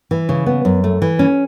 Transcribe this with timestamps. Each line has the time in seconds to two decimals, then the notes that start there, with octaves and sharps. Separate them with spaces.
0.11 E3
0.29 C#3
0.46 B3
0.65 F#2
0.84 A3
1.02 E3
1.19 C#4